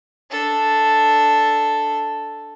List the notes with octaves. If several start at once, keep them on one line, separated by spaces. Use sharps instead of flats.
D4 A4